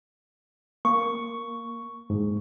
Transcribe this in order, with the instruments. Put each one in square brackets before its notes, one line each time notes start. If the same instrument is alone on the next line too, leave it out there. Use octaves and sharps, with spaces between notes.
[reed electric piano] A#3 [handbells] C#6
[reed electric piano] G#2